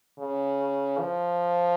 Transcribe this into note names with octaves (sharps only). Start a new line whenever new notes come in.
C#3
F3